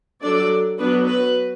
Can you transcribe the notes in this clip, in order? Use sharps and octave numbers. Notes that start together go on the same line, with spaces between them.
F#3 D4 A4 D5
F#3 B3 D4 F#4 B4
F#4 B4